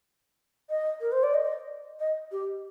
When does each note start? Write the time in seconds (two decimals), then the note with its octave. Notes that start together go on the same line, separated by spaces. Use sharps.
0.70 D#5
1.01 A#4
1.12 C5
1.23 D5
1.34 D#5
2.00 D#5
2.32 G4